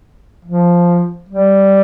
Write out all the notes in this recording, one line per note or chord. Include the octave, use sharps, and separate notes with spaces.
F3
G3